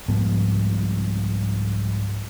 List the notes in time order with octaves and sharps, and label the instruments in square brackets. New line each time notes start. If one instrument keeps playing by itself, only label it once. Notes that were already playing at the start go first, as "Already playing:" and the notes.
[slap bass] C2 G#2 F3 B3